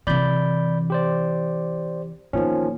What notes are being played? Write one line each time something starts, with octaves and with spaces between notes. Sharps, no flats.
C3 E3 D5 B5 G6
G4 C5 D5
E2 A#2 D#3 F3 C#4